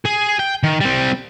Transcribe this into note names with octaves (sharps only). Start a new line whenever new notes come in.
G#4
G5
D#3
G3 C4